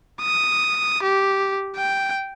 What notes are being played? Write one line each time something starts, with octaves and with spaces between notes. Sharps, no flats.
D#6
G4
G5